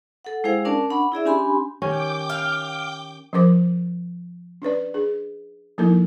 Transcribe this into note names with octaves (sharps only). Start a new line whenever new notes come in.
A4 F#5
G#3 E4 G#4 C5 F5 G5
C#4 D4 A#4 D5 A5
D4 F#5 B5 C#6
E4 G#4 D5 E5
C#4 D4 G4 G#5 B5 C6
D#3 C#4 G4 G5 D6 G6
F5
F3 C#4 A#4 C5 D6
C#4 D4 B4 D5
D4 G#4
F3 A#3 D#4 E4 A4 A#4